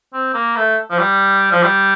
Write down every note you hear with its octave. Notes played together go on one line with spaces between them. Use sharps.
C4
A#3
A3
F3
G3
F3
G3